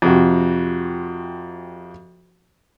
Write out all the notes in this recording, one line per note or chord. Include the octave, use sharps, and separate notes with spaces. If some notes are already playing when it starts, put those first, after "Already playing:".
F2 C3 F#4